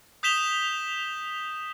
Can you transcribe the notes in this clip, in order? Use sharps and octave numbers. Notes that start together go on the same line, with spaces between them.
D#6 G6 B6 E7 F7 G7